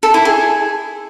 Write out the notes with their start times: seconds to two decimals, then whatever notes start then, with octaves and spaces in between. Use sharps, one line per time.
0.03 A4
0.14 E4
0.25 G#4